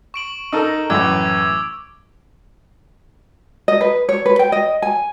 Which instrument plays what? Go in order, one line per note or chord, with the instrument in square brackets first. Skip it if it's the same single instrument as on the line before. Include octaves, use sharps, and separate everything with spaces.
[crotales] C#6 D7 F#7
[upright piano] D#4 A4 A#4
[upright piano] F#2 A2 E3 [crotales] D6 E6 G#6
[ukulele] D#5
B4
C#5
B4
G5
D#5
G#5